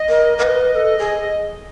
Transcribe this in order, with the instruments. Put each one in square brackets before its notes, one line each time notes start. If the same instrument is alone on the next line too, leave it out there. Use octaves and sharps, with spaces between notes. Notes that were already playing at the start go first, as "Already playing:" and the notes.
Already playing: [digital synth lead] D#5
[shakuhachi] A#4
A#4
B4
A4
G#4